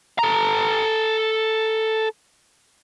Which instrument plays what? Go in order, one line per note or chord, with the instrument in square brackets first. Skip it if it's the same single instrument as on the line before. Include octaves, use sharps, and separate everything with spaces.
[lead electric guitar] A4 A#5